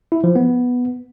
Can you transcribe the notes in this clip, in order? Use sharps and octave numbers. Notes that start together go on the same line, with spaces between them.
E4
F3
B3